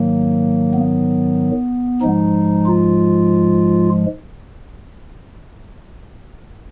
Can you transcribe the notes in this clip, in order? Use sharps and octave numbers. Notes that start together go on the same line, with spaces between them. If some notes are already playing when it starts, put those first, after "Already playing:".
Already playing: G#2 D#3 F#3 A#3
B3
G#2 F3 G#3 D#4
F4